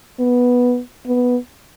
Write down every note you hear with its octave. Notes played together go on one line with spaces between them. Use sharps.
B3
B3